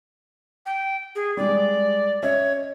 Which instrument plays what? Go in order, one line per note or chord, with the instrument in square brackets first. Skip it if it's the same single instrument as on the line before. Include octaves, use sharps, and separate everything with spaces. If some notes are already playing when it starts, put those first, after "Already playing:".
[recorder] G5
G#4
[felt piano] G3 G#3 [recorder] D5
[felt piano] C#4 D#5 E5 [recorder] C#5